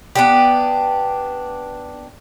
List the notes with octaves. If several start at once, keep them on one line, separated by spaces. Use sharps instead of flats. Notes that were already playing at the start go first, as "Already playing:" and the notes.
B3 D4 G4